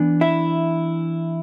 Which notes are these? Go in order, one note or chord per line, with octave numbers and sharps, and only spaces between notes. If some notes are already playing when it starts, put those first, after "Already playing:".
Already playing: E3 B3 D4
E4 E5